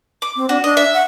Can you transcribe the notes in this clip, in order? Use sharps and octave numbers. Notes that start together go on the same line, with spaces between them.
D6
C4
D4 F#4
D4 D#5
E5
F#5